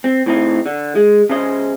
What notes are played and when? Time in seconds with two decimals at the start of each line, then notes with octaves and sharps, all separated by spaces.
0.04 C4
0.26 A2 C4 D#4
0.66 D3
0.95 G#3
1.30 C#3 C#4 C5 D#5